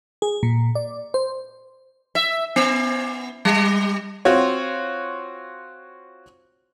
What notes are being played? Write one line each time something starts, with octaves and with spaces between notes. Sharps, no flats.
G#4
A#2
D5
C5
E5
B3
G3
C4 F4 F#4 C#5